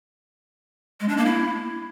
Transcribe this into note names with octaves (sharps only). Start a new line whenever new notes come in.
G#3
D4
A#3
E4